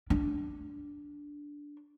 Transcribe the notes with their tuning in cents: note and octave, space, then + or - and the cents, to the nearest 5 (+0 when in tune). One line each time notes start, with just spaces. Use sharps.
D4 -10